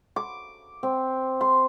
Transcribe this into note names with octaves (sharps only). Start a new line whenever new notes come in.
D6
C4
C6